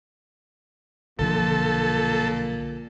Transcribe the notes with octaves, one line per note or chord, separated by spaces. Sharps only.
B1 A#2 D3 F3 A4